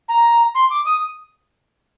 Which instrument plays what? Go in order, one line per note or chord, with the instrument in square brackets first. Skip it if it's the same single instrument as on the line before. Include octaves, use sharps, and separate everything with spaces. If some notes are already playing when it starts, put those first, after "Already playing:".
[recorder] A#5
C6
D6
D#6